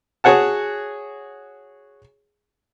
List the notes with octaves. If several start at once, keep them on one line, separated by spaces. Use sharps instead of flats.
F#4 G#4 C#5 F#5 A5